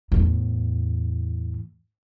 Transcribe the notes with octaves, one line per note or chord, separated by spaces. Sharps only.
E2 A2